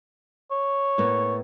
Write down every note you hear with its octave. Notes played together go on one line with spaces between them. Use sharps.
C#5
A2 A#3 B3